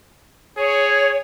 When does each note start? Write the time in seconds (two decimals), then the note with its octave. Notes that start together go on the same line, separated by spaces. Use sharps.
0.57 G#4 C#5